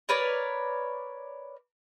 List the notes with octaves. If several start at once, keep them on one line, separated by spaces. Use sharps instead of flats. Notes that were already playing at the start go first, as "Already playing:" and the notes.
A#4 B4 C#5 D5